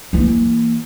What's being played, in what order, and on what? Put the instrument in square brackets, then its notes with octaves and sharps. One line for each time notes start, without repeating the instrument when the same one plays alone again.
[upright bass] E3 A#3